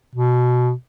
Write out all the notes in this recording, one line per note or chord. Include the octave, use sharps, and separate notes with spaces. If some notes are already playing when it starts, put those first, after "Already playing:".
B2